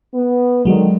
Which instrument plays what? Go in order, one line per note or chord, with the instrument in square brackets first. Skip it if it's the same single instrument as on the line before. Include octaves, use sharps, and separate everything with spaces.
[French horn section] B3
[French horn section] D3 D#3 [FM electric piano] F#3 G#3